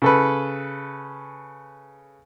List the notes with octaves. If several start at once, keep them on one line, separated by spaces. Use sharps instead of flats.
C#3 A4 B4